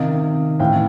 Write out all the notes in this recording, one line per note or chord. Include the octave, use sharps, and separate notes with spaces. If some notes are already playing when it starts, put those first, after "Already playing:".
Already playing: C3 D#3 D#5 F5
A2 E3 F5 G5